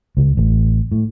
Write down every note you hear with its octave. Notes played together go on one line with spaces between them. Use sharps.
C#2
A1
A2